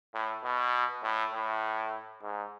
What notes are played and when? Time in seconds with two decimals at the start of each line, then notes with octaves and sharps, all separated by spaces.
0.14 A2
0.43 B2
1.03 A2
1.33 A2
2.23 G#2